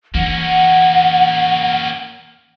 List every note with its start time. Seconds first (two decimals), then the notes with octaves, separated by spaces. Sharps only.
0.15 E3 A#3 C#4 F#5